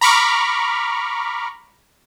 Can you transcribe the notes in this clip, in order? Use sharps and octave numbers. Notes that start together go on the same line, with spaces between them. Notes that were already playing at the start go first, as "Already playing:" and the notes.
A#5 B5 C#6 D6 F6